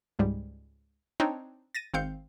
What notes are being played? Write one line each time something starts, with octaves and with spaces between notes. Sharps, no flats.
C#2 G#2 G3
C4 D4 D#4 C#5
A6 A#6 D#7
G#1 C4 F5 G6 C#7